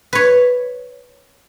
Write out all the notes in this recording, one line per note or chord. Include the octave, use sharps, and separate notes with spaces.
B4 C#5